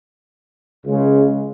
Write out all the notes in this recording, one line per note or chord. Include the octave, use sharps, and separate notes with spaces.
C#2 C#3 G#3